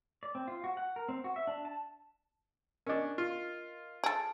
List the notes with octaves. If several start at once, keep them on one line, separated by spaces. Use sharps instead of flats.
D5
C4
F4
F#4
F#5
A#4
C4
F#4
E5
D4
A5
C#4 D4 A#4 D#5
F4
G#4 A4 D7